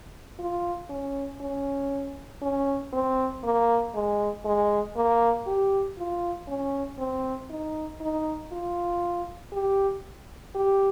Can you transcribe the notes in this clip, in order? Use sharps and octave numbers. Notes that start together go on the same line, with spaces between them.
F4
C#4
C#4
C#4
C4
A#3
G#3
G#3
A#3
G4
F4
C#4
C4
D#4
D#4
F4
G4
G4